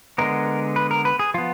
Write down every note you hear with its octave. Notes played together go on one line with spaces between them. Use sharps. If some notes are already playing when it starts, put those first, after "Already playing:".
D3 G#3 B3 A#4
B4
A#4
B4
G#4
F3 B3 F4